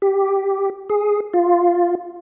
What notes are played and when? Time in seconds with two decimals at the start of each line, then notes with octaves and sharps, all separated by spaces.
0.02 G4
0.89 G#4
1.34 F4